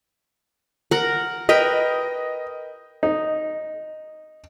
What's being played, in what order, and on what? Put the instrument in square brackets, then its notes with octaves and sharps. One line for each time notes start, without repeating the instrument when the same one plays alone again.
[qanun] A#4 F#5
[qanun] A#4 B4 G5 [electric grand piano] D#5
[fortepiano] D#4